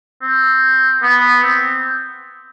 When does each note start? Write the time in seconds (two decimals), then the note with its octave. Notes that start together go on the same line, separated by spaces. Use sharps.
0.22 C4
1.02 B3
1.43 C4